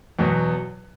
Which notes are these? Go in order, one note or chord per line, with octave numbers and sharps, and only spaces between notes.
E2 B2 F#3 B3